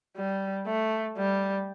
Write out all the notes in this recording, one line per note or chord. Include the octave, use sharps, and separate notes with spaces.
G3
A3
G3